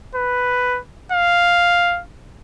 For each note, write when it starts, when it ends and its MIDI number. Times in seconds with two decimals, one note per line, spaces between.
0.15 0.79 71
1.12 2.01 77